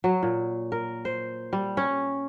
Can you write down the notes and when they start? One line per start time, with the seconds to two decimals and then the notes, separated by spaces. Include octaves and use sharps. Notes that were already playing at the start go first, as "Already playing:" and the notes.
0.04 F#3
0.23 A#2
0.72 A#4
1.05 C5
1.53 G3
1.77 C#4